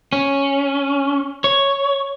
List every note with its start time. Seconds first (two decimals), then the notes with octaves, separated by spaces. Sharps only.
0.13 C#4
1.44 C#5